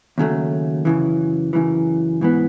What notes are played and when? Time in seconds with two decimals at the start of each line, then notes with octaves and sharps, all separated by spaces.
0.18 D#2 C#3 F#3 A3
0.85 F#2 C#3 E3
1.53 F#2 C#3 E3
2.21 G#2 E3 B3